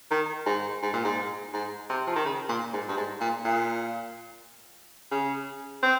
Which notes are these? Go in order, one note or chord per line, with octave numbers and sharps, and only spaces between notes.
D#3
G#2
G#2
A#2
G#2
G#2
C3
F3
D#3
C#3
A#2
G#2
G2
G#2
A#2
A#2
C#3
C4